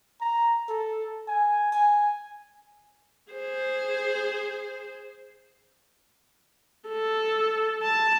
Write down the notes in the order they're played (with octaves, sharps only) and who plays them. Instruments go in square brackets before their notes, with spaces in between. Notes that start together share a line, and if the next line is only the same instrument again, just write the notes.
[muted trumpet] A#5
A4
G#5
G#5
[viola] G#4 C5
A4
A5